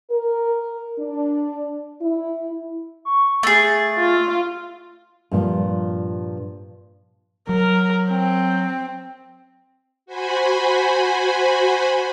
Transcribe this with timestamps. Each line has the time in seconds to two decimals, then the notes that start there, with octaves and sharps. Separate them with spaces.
0.11 A#4
0.99 D4
2.02 E4
3.05 C#6
3.43 A3 G#4 A6
3.99 F4
5.31 G2 A#2 F3
7.49 F#3 A#4
8.10 C4
10.06 F#4 C5 G#5 B5